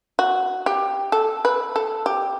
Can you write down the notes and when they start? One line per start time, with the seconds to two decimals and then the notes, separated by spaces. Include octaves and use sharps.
0.19 F#4
0.66 G4
1.12 A4
1.45 B4
1.76 A4
2.06 G4